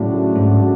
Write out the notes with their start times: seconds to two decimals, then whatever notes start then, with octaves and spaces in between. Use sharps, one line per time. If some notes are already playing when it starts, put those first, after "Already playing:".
Already playing: A2 C#3 F#3 A3 D4 F#4
0.36 G#2